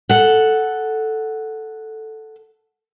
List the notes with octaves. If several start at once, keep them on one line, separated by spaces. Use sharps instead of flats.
A4 F#5